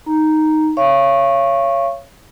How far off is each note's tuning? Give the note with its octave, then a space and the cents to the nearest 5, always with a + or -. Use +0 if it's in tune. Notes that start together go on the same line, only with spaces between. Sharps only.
D#4 +0 A#5 +0
C#5 +0 F5 -35 C#6 -15